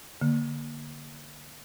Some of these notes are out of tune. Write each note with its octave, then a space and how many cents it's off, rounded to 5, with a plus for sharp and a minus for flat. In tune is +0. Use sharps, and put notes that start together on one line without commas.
D3 +0 A#3 +0